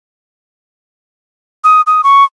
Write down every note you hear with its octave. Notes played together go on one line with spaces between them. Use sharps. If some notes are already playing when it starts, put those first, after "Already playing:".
D#6
D#6
C#6